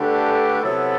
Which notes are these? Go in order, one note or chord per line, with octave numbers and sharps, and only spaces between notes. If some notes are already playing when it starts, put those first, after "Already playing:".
Already playing: D3 A3 D4 G4 B4
C3 F#3 B3 E4 A4